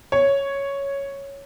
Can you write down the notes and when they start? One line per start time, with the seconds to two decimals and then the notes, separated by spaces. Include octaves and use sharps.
0.12 C#5